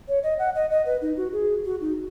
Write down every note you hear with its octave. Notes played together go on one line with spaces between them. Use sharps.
C#5
D#5
F#5
D#5
D#5
B4
D#4
F#4
G#4
F#4
D#4